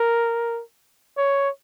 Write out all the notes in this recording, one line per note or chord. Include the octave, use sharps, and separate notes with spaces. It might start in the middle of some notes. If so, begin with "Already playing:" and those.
Already playing: A#4
C#5